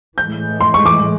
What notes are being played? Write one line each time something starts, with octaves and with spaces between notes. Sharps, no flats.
A2 E3 G#3 G6
C6
C#6
D6